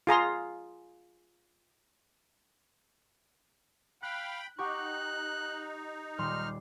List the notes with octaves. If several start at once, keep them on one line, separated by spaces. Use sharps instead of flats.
F4 G#4 A#5 C6
F5 G5 B5 F#6
D#4 G4 F#5 C#6 F#6
D#1 G3 C6 F6